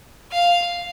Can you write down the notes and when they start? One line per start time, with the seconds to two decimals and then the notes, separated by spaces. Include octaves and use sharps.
0.31 F5